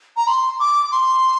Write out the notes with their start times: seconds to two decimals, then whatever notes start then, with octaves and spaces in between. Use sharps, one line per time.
0.17 A#5
0.27 C6
0.60 D6
0.92 C6